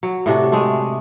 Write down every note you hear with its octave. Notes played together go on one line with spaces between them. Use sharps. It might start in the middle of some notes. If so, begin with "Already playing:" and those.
F#3
A2 C3 D4 F#4
G#3 A3